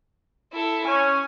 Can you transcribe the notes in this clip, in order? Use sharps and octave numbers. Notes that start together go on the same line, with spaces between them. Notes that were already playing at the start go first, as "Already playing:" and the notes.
E4 A4
C#4 G#5